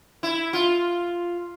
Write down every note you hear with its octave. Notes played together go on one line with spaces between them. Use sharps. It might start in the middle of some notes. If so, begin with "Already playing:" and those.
E4
F4